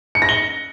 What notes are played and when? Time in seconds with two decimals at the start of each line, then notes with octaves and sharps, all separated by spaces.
0.15 C#7
0.22 A#6
0.29 G7